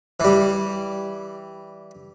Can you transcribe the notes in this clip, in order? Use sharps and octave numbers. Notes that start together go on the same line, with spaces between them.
E3 G3